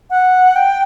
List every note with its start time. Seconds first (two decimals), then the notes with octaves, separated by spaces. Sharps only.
0.10 F#5
0.56 G5